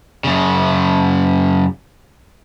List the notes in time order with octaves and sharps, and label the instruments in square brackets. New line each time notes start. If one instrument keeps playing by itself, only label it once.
[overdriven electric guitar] F#2 C#3